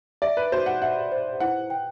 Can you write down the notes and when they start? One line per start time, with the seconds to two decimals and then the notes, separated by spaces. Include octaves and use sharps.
0.22 D5 E5
0.37 B4
0.52 F#4 C5
0.66 F#5
0.82 E5 F#5
1.12 C5
1.40 E4 F#5
1.70 G5